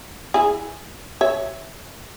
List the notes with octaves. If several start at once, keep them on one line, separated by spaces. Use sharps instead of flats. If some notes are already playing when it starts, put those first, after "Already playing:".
E4 G#4
C#5 E5